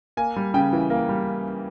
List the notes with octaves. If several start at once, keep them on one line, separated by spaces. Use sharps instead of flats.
A#3 G#5
G3
C#3 G5
E3
A#3
G3